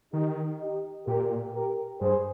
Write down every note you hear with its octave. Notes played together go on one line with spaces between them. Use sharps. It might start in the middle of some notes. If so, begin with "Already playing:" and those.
D#3 D#4 G4
D#4 G4
A#2 G4 A#4
G4 A#4
G2 G#4 C5